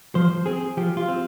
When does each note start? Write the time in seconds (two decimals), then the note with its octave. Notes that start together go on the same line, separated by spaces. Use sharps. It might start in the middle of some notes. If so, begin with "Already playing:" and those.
0.15 F3 C5
0.46 C4 G#4
0.77 F3 G4
0.97 F4
1.08 C4